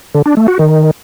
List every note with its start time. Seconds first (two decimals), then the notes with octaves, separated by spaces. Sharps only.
0.15 D3
0.26 D4
0.37 A3
0.48 F#4
0.59 D#3